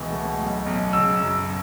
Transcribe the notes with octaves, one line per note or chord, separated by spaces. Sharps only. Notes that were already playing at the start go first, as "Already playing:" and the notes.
Already playing: C#2 B2 E3
A2
B1
B1
C#3 E6
F#2